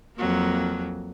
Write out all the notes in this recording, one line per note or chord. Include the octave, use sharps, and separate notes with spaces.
F2 F#3 A#3